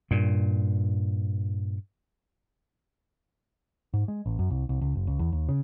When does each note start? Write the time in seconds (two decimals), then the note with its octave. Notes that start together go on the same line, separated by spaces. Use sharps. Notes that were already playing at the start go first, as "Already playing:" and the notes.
0.11 G2 A#2
3.94 G#2
4.08 G#3
4.26 A1
4.39 F#2
4.50 C2
4.69 C2
4.81 C#2
4.95 F#1
5.07 C#2
5.19 E2
5.32 D#2
5.49 C#3